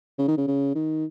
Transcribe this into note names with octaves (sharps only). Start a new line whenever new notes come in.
C#3
D#3
C#3
C#3
D#3